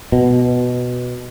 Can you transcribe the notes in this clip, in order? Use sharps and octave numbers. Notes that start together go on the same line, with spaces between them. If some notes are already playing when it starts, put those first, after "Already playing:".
B2